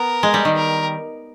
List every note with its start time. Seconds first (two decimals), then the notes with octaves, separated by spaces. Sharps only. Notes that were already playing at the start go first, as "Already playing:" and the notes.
Already playing: B3 A#4
0.23 G#3
0.34 G3
0.45 D#3
0.56 A#4